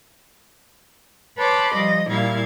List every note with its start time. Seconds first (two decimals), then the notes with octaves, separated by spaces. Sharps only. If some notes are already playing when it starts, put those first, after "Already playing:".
1.38 B4 C#5 A5 B5 C6 D6
1.73 F3 G3 D#5
2.10 A#2 G3 E4 F5 G#6